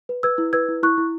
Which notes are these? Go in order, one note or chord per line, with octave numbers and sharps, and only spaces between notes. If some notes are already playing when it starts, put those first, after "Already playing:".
B4
B4 E6 G#6
E4
B4 E6 G#6
E4
E4 C#6 F#6
E4